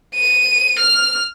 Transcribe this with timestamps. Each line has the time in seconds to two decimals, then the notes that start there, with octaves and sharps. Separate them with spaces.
0.15 D#7
0.79 F6